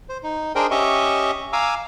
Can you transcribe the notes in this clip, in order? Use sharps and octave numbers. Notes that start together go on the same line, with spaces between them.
C5
D#4
D4 G#4 A#4 C5 D#5 G5
C#4 G4 D#5 E5 C#6
F5 G#5 A#5 D6 E6